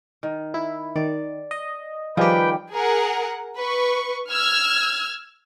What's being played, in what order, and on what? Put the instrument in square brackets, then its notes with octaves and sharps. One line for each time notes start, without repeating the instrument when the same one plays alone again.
[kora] D#3
[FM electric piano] E4
[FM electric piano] D#3 [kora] D5
[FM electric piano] D#5
[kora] D#3 G3 G#4 [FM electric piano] F3 G4 [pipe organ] B4 G5
[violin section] G#4 A#4 F#5
B4 C#6
E6 F6 G#6